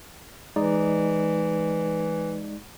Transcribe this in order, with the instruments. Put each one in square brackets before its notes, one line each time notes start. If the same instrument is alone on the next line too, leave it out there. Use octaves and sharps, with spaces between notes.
[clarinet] E3 [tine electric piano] G#3 D#4 D5